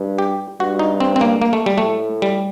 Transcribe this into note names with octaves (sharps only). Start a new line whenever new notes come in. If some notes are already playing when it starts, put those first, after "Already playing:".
Already playing: G2
G4
G2 F#4
D#4
C4
C4
A#3
A#3
A3
G3
A2 A3
G3